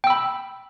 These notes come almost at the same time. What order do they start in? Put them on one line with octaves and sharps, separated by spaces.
G5 E6 B5